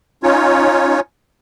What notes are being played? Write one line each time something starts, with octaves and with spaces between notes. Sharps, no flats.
C#4 D#4 F4 C#5